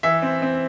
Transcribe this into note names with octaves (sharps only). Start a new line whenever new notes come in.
E3 E5
C4
C4